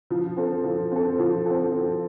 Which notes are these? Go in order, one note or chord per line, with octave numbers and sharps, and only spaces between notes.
F3
C4 A4
F3
C4 A4
F3
C4 A4
F3